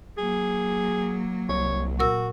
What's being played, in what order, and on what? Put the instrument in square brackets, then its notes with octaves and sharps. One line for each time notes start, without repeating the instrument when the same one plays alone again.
[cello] F#3 A#3 [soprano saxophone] G#4
[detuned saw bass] C2 [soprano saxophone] C#5
[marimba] A#2 A#4 E6 [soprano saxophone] F#4